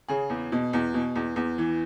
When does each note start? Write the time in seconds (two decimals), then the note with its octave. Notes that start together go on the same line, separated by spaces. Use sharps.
0.08 C#3 G#4
0.30 E2
0.52 B2
0.73 E2
0.94 B2
1.15 E2
1.36 E2
1.58 E3